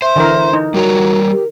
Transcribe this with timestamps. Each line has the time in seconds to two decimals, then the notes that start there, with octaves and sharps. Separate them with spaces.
0.02 C5 E5 C6
0.16 D3 E3 A#4
0.53 D#4
0.74 G3 F#4 A#4 C#5 A#5
1.32 G4